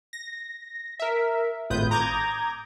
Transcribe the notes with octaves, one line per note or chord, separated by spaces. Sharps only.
A#6
A#4 E5
G#1 A2 F4 B4 D#6 G6
A#5 D6 D#6 G6 G#6 A#6